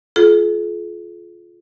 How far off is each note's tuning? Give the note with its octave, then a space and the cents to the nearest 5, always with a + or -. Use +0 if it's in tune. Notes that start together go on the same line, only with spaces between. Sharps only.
F4 +0 G#4 +45